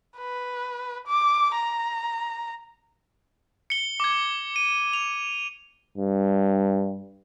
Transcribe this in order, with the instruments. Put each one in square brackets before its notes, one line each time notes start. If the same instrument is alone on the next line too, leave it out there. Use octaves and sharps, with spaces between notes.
[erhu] B4
D6
A#5
[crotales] C#7 G7
D6 G#6
D#7
F7
[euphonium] G2